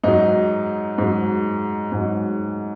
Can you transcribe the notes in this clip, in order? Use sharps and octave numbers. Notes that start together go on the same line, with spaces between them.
G#2 F#3 D#4
G#2 F#3
G#2 F#3